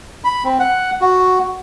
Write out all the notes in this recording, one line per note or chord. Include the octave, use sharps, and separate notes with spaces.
B5
C4
F#5
F#4